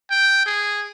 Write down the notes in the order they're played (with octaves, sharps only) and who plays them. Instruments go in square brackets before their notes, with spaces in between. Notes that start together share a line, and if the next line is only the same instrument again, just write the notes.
[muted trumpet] G5
G#4